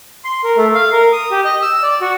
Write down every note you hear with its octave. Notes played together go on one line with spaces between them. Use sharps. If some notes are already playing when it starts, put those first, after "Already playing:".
C6
A#4
A3
F5
A#4
D#6
G4
D#5
E6
D5
F#4